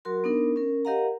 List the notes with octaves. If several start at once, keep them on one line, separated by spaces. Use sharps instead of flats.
F#3 F#4 A#4 C6
B3 D4 D#4 A#4
C#4 A#4
G4 A#4 D#5 F5 F#5 A#5